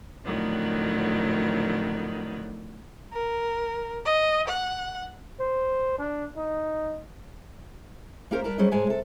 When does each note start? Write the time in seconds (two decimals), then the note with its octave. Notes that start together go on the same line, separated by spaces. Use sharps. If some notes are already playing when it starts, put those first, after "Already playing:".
0.25 F2 A2 D3 D#3 F#3 B3
3.13 A#4
4.05 D#5
4.48 F#5
5.40 C5
5.98 D4
6.37 D#4
8.31 A#3 C#4 G4 A#4 C5
8.44 G2 A#4 B4 A5
8.58 F#3 G3 C#4 G#4 C5 D#5
8.71 G#2 G#3 C#5 G#5 A5
8.87 C3 A4